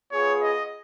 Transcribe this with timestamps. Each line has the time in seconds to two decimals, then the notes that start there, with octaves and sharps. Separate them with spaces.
0.12 B3 F4 G#4 C#5
0.42 D#5